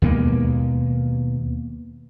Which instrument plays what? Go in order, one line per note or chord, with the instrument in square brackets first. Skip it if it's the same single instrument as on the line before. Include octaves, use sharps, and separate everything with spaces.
[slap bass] D#2 B2 G#3 A#3